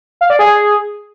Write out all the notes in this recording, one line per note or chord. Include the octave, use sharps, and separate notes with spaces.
F5
D5
G#4